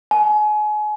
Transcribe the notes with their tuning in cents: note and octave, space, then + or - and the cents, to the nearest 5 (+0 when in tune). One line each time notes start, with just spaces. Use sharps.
G#5 +35